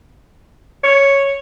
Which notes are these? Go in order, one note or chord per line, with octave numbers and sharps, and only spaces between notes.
C#5